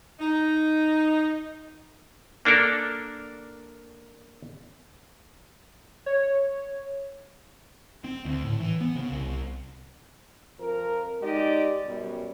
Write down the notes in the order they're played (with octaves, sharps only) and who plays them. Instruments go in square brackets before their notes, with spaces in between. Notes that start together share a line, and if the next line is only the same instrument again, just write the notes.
[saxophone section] D#4
[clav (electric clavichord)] A#3 D4 A4 A#4
[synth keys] C#5
[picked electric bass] C4
D2
A2
E3
B3
C#3
C2
[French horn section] F2 F3 A#4
G#3 D#4 G4 D5 D#5
F#2 B2 G3